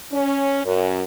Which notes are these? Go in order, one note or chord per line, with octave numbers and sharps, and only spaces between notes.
C#4
F#2